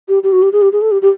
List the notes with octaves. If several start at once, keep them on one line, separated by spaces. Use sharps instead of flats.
G4
G4
F#4
G4
G#4
G4
G#4
A4
G4
G4